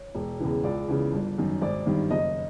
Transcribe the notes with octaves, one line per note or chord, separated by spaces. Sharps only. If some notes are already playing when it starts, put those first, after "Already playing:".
Already playing: C#5
E1
E2 C#3 E3
C#2 D5
C#3 E3
G1
F#2 D#3
G#1 D5
G2 D#3
F#1 D#5